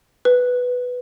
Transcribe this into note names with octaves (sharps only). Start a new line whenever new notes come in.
B4